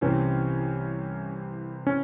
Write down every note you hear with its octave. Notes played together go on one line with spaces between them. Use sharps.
C2 C3 E3 C4 C#4
C#4